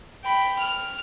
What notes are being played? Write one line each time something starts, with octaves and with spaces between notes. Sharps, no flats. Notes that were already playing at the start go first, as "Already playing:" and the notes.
G5 B5
F6